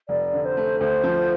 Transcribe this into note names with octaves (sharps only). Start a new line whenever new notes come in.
F1 D5
D3
C5
A3
D2 C5
F3